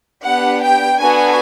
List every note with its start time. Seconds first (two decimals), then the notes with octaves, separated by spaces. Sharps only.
0.24 B3 D4 G4 F#5
0.62 G5
1.01 B3 D4 F#4 A4 G#5